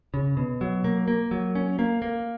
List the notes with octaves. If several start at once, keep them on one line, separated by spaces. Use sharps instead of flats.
C#3
B2
F#3
A#3
A#3
F#3
C#4
A#3
A#3